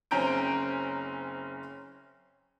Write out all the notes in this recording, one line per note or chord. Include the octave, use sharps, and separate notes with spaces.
F#1 C4 C#4 A#5 G6 D7